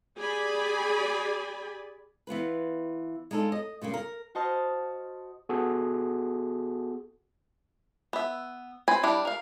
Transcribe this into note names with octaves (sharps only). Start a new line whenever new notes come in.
G4 G#4 D5 G#5 B5
E3 B3 F4 B4
G#3 D4 D#4 F4 A4
D#5
A#2 C#3 G3 A#3
A#4
F#4 C5 D#5 A5 D#6 F6
B3 F#4 G#4 A4
B3 E5
C4 B4 G#5
G3 D4 E4
A#4 F5